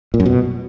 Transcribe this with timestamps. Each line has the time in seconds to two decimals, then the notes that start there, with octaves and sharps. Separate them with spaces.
0.14 A#2
0.20 F#2
0.26 B2